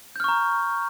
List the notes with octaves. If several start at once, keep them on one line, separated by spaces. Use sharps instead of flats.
A#5 C#6 F6 G6